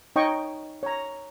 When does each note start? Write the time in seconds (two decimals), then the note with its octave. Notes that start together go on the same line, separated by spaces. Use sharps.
0.16 D#4 C#5 D#5 G5 C#6
0.83 C#5 A#5